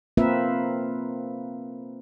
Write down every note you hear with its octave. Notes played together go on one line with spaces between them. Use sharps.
A#3 C4 F4 A#4 B4 E5